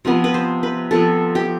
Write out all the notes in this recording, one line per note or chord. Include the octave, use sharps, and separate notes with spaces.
C3 F3 B3
B4
C5
B4
C3 F3 B3 A4
G4